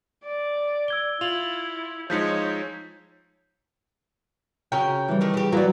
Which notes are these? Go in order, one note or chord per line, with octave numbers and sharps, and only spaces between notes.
D5
E6 G#6 G7
E4 F4 F7 F#7
F3 G#3 D#4 C#5 G6 B6 C#7
C#3 C#4 F#4 A#4 G5 F6
E3 G3
D#3 A3 A#4
C#3 G4
F#3 A#3 F#4 B4 D5